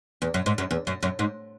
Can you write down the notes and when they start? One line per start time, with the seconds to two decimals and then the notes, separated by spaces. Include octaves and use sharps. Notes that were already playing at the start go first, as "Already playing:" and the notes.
0.22 E2
0.34 F#2
0.46 G#2
0.58 F#2
0.71 E2
0.87 F#2
1.03 F#2
1.19 G#2